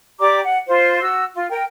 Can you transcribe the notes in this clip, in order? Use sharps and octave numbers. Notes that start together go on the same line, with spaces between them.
G4 D5 A#5 D6
F#5
F4 C5
F#4 E6
F4
A#4 G5